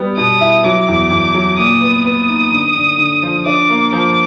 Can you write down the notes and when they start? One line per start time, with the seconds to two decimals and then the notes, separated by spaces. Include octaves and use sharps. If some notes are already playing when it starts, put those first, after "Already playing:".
Already playing: G3 B3
0.17 B2 D#6
0.40 E4
0.64 F#3 D6
0.88 E2
1.10 E2
1.34 F#3
1.57 A#2 D#6
1.81 B3
2.05 B3 D#6
2.28 D#4
2.52 D3
2.76 D3
2.98 D3
3.22 F3
3.46 D4 D6
3.69 A#3
3.92 F3 D6